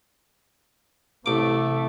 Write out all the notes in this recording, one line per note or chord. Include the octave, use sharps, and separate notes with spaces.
A1 C3 A3 D6